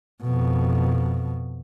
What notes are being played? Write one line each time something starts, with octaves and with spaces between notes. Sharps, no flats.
F2 B2